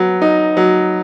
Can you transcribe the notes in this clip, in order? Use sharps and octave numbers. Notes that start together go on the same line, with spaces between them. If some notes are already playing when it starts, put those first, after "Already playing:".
Already playing: F#3 B3
D#4
F#3